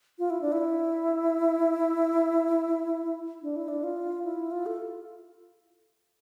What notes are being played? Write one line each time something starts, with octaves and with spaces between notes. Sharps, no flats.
F4
E4
D4
E4
D4
E4
D4
F4
E4
F4
A4